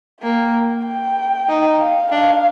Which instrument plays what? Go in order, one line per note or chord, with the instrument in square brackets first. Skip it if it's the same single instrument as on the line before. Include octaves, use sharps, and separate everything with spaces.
[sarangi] A#3 [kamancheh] G5
[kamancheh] G5
[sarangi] D#4
[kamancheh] F5
[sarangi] D4 [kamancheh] F5